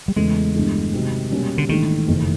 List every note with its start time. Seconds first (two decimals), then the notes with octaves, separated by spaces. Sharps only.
0.08 G3
0.16 E2 C#3 E3 G#3 A3
0.55 G1 G2 E3 A3
0.93 C3 D#3 F#3
1.31 B2 G3 A#3 C#4
1.58 D3
1.69 A#1 G#2 D#3 E3 A3 D4
2.07 F#1 F2 C3 E3 A3